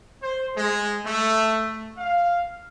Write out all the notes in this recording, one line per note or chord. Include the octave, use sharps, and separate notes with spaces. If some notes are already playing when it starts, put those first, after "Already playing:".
C5
G#3
A3
F5